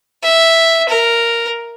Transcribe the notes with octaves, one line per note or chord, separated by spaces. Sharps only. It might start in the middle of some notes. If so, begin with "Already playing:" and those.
E5
A#4